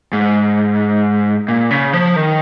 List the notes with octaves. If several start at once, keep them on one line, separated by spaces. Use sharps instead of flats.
G#2
A#2
C#3
F3
D#3